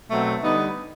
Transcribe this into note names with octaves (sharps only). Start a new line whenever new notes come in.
B2 F#3 A3 C4
D3 G3 B3 D#4